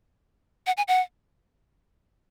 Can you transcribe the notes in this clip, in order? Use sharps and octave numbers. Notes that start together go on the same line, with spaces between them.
F#5
G#5
F#5